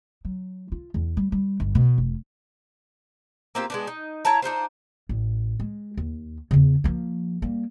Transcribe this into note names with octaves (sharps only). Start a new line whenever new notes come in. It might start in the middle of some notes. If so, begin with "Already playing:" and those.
F#3
F4
E2
G3
G3
G1
B2
F1
A#3 C4 F4 G4
G#3 B3 D4
D#4
E4 C#5 A5 A#5
D4 D#4 F4 C5
A1
G#3
D#2
E2 C#3
F3 A#3
G3 A#3